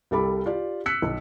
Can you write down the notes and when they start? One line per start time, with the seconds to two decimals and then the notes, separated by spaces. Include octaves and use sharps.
0.11 C2 G3 A4 B5 D6
0.46 F4 G4 D5
0.86 E6 F#6 B6 C#7
1.02 B1